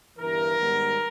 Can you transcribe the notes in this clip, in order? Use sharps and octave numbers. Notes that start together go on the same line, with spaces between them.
G1 G2 E3 A#4
G#2 D#3 G3 B3